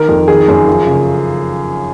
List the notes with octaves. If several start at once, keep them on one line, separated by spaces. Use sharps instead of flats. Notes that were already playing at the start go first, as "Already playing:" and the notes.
Already playing: D#3 A#4
F2
D#3 G#4
F#2
F3
C#3